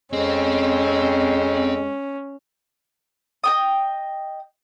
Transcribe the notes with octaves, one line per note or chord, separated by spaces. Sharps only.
F2 G#3 C4 C#4
D#5 G5 D#6